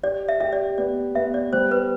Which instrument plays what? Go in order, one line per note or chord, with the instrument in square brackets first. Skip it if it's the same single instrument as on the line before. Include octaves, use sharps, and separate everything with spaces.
[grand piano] G4 [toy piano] D5
[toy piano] E5
[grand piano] G4 [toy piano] E5
[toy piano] D5
[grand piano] B3 [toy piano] D5
[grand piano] B3 [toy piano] E5
[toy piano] D5
[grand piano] G3 [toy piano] C5
[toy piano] B4